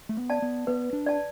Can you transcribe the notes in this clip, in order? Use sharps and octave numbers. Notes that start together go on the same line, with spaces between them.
A3
B3
D5 A5
B3
B3 B4
D4
D5 A5